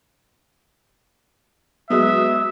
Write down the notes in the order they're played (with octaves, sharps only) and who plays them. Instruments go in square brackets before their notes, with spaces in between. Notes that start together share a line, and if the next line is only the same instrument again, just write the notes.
[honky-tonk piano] F#3 G#3 [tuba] B3 [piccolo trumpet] E5 [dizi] D#6